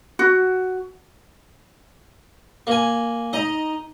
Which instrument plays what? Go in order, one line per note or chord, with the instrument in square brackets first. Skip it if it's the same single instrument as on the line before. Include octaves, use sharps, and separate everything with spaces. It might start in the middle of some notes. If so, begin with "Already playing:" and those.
[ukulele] F#4
[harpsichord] A#3 G#5
[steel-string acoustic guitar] D#4 A#5 [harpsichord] D#5